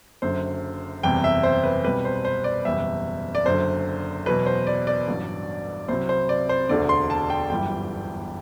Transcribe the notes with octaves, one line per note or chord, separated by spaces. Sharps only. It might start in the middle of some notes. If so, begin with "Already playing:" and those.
F#1 F#2 D3 C5
F#1 E2 C3 G3 G5
E5
C5
B4
C2 B2 G3 B4
C5
C5
D5
F#1 E2 B2 G3 E5
D5
F#1 F#2 D3 C5
E2 B2 F#3 B4
C5
D5
D5
A1 G2 F#3
C2 C3 F#3 C5
C5
D5
C5
E1 D2 D3 D5
C6
A5
G5
G1 F#2 E3 G3 G5